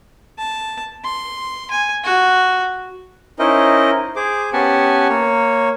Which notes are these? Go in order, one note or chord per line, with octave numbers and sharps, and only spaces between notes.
A5
C6
G#5
F#4
C#4 D#4 E4 A#4 C5 D#5
G#4 C5 D6
B3 C#4 G4 F#5 G#5 A5
A#3 C#5